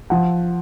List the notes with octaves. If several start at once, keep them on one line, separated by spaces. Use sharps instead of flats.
F3 F#5